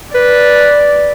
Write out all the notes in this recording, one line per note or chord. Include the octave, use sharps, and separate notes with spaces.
B4 D5